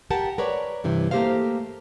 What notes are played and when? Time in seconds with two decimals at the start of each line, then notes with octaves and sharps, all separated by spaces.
0.10 G4 A#4 F#5 A5
0.38 A#4 B4 C#5 D5
0.84 G2 C3 E3
1.11 A3 A#3 G4 A#4 C5 F5